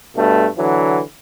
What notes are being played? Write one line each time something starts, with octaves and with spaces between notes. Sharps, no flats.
G2 B2 A3
D3 E3 F#3